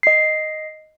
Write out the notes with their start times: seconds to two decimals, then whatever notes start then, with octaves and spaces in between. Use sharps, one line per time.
0.03 D#5 C7